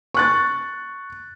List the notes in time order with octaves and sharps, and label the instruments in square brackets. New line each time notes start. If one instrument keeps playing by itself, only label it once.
[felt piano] C#6 F#6 A6